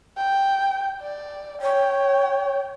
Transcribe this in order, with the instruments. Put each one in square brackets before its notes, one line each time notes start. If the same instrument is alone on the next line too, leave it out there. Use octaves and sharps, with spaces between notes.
[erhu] G5
D5
[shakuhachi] C#5 [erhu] G5